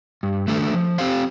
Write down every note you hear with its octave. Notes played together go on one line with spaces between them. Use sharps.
G2
D#3 A3 D4 A4
F3
C4 G4 C5 F5